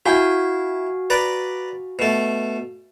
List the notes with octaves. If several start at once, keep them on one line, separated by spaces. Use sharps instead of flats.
E4 F#4 F5 G#5
B4 D5 A#5
B2 A3